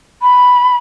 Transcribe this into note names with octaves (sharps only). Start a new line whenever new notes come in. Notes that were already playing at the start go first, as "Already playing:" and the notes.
B5